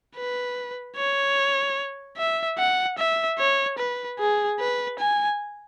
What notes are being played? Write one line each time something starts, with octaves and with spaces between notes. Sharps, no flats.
B4
C#5
E5
F#5
E5
C#5
B4
G#4
B4
G#5